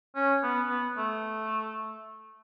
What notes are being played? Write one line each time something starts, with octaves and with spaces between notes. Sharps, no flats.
C#4
B3
B3
A3